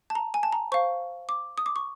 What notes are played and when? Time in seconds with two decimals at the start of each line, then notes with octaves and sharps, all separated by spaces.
0.10 A5
0.15 A#5
0.34 G#5
0.43 A5
0.52 A#5
0.72 C5 F5 C#6
1.29 D6
1.58 D#6
1.66 D6
1.76 C#6